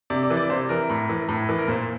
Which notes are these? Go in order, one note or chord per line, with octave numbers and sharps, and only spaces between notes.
C3 D5
D5
E3
D5
C3 C5
E3 A#4
A2
E3
A2
E3
A#4
A#2 C5